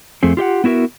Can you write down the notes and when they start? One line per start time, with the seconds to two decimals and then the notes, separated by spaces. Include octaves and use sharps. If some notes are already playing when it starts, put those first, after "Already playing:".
0.23 F2 A3 C4 G#4
0.37 F4 G4 D#5 F#5
0.64 B3 E4 F#4 A#4 E5